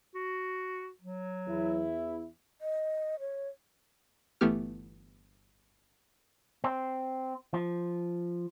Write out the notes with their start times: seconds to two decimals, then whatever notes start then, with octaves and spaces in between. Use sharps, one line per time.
0.14 F#4
1.01 F#3
1.47 E2 E4
2.61 D#5
3.20 C#5
4.41 G1 E3 A3 B3 G4 F6
6.64 C4
7.54 F3